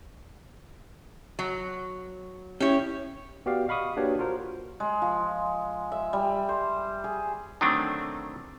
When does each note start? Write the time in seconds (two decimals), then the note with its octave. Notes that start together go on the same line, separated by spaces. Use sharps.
1.39 F#3
2.60 C#4 E4 G4 C#5
3.46 B3 F#4 G4 D5 F5
3.68 D#5 F5 B5 C#6 D#6
3.97 A#3 D4 F#4 G4 B4 C#5
4.19 F4 F#4 A#4 C5
4.80 G#3
5.02 F3
5.92 E5
6.13 G3
6.49 C5
7.04 G#4
7.61 D3 D#3 F#3 A3 C4 D4